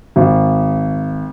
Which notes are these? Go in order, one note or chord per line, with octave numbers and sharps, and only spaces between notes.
G#1